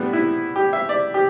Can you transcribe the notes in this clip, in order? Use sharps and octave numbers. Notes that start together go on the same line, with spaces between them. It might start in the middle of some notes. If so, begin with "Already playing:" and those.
Already playing: A2 G3 B3 D4
E4
G4
E5
D5
G4